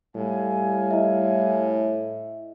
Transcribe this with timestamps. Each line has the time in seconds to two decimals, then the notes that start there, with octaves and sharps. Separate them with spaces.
0.16 A2 G3 F5 G#5
0.91 E4 D#5 E5